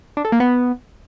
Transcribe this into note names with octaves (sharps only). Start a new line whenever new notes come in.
D4
A4
A#3
B3